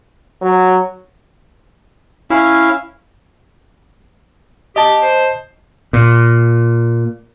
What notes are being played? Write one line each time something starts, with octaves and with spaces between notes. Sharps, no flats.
F#3
C#4 E4 F5
G4 D#5 A5
C5
A#2